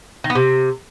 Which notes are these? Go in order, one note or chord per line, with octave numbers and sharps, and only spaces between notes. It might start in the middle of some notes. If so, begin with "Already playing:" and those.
D#3
B3
C3